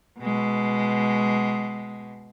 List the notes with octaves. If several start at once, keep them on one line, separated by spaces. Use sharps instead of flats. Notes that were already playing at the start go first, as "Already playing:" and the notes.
B2 G#3